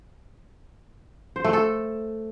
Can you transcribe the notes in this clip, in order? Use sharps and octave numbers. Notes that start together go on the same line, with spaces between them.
C5
A3
A4